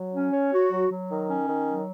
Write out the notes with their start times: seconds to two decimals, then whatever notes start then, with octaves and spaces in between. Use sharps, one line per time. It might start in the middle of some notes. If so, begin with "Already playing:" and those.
Already playing: F#3
0.13 C#4
0.32 C#5
0.52 F#4
0.71 F#3
0.90 F#3
1.09 D#3
1.29 C#4
1.48 D#3
1.67 F#3